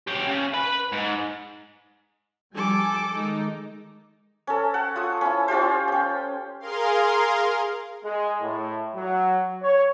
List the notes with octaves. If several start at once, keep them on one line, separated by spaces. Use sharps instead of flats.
C#4 G4
C#3
B4 B5
G#2
F3 G3 A4 G#5 D6
D#3 G#3 D#4
C#4 A4
F#5 A5
F4 D#5 C#6 D#6
C#4 E4
C#4 F4 G4 C5
C#4 G5
G#4 A#4 F5 C6
G#3
A2
F#3
C#5